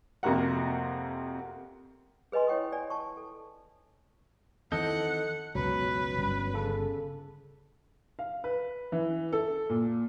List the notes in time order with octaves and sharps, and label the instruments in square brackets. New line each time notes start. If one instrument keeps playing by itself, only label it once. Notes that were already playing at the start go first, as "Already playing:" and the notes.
[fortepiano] F2 C3 A#3 F#4 A#4 F#5
[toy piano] G#4 B4 D#5 G#5 C6
E4 C#5 G5 C#6 D#6
D5 G#5
A5 C#6
A4
[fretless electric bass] D#3 E3 C4 [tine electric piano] A4 D#5 G6 [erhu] F#5
[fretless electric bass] C#2 F#2 B2 [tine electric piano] F#3 [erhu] B4
[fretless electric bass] G1 G3 C#4
[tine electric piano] C#3 A4
[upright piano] F5
B4
E3
A4
A#2